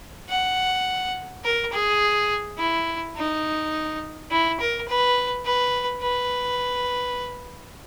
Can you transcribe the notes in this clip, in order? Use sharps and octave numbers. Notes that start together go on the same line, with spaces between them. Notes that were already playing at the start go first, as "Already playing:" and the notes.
F#5
A#4
G#4
E4
D#4
E4
A#4
B4
B4
B4